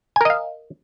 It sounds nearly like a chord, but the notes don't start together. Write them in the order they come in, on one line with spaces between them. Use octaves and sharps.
G#5 A#4 D#5 F5